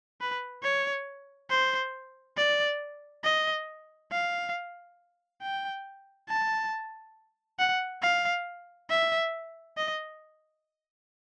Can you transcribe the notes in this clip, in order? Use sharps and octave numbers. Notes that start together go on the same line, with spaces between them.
B4
C#5
C5
D5
D#5
F5
G5
A5
F#5
F5
E5
D#5